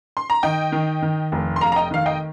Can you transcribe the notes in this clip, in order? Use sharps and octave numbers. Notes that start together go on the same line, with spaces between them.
C6
A#5
D#3 D#5 G5
D#3
D#3
F1
C6
F1 F5 A#5
A#5
D#5 G5
D#3 F5
D#5 G5